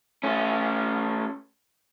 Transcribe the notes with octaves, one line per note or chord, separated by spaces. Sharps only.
A3 C#4